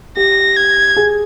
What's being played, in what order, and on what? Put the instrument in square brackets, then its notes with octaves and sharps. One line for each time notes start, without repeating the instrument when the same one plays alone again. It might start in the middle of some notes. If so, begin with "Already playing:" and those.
[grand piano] G4 [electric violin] A#6
[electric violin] G#6
[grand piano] G#4